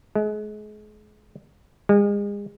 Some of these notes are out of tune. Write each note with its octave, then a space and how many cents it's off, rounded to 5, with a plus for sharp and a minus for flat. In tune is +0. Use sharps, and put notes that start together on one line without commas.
G#3 +35
G#3 -35